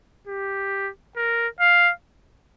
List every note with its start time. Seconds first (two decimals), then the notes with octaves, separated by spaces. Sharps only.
0.27 G4
1.17 A#4
1.61 F5